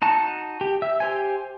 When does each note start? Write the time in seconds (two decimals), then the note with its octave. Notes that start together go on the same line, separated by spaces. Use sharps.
0.02 D#4 F#4 A5
0.61 G4
0.82 E5
1.00 G4 C5 G#5